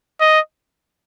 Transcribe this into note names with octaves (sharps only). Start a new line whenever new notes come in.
D#5